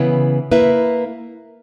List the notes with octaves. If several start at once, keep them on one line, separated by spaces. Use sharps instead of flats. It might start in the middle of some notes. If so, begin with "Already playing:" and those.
Already playing: C#3 E3 B3 E4 B4
A#3 E4 B4 E5